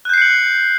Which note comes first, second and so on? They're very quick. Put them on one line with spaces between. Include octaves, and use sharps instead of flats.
F#6 G6 C7 C#7 F#7